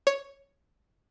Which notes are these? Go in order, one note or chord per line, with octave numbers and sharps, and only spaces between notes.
C#5